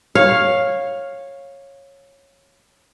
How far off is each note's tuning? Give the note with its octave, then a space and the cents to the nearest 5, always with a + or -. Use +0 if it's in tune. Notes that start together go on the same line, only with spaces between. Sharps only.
C#5 -10 F5 +5